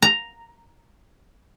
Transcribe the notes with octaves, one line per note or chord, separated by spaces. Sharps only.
A#5